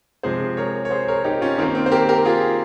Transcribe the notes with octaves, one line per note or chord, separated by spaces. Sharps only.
C3 F3 G#3 G#4 C5
A#4 C#5
C#5
G#4 C5
A#4 C#5
D#4 G4
C#4 F4
D#3 A#3 C4 D#4
C4
C5
G4 A#4
G4 A#4
F4 G#4